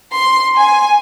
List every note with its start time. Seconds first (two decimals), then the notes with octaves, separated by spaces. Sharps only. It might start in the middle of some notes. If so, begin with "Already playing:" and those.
0.13 C6
0.57 G#5